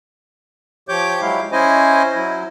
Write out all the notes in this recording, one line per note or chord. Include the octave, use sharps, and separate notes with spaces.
F3 G4 C#5 D6 G6
F#3 G#3 E4 F5
C#4 E4 C5 D#5 G#5
F#3 E4